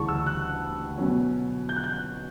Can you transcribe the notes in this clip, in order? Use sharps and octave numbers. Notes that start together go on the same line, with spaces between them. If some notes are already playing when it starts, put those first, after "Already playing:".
Already playing: D2 C#3 E3 G3 A5 C#6
E6
F#6
B2 F#3 C#4
G6
F#6
G6